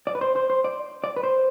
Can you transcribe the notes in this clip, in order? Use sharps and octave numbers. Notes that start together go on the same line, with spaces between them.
D5
B4
C5
C5
C5
D5
D5
B4
C5